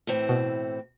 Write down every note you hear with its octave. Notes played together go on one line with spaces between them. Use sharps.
A2 E3 C4
B2